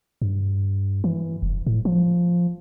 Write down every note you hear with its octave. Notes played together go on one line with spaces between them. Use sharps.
G2
E3
F1
A2
F3